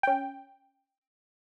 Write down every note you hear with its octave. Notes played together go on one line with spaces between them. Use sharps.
C#4 G5